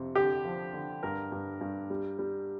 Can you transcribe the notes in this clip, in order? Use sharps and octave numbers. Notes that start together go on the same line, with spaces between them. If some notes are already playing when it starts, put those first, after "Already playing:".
Already playing: F2 C3
D3 G4
F3
D3
G2 A#4
G2
G2
G3
G3